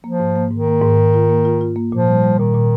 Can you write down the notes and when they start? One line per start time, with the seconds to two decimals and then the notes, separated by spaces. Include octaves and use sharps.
0.04 F3 A#3
0.20 G#2
0.36 A#3
0.51 G#2 D#3
0.68 A#3
0.82 G#2
0.98 G#2
1.14 F4
1.30 A#3
1.45 F4
1.61 F4
1.76 A#3
1.92 A#2 F3
2.08 G3
2.23 G3
2.39 A#2 D#3
2.54 A#2